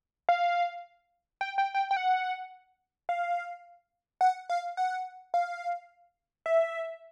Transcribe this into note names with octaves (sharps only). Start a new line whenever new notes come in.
F5
G5
G5
G5
G5
F#5
F5
F#5
F5
F#5
F5
E5